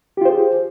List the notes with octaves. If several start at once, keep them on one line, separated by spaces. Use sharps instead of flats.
F4 G4 G#4 C5